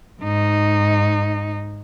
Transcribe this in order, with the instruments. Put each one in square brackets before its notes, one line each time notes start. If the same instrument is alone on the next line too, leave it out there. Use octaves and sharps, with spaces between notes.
[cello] G#2 D#4